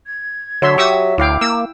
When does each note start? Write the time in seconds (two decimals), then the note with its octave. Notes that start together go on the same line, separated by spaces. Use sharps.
0.06 G#6
0.62 D3 F#3 C#5 E5 C6
0.78 G4 E5 C#6 D#6 E6
1.18 D2 E4 F5 G5 D6
1.41 A#3 E6